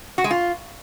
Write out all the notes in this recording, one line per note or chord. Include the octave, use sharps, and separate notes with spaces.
F#4
G#3
F4